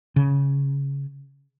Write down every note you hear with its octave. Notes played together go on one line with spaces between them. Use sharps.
C#3